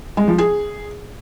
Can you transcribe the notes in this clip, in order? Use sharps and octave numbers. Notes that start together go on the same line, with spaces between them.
G#3
F3
G#4